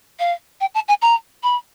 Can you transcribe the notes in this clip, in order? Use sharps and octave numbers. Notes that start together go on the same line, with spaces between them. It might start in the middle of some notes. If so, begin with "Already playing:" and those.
F5
G5
A5
G#5
A#5
B5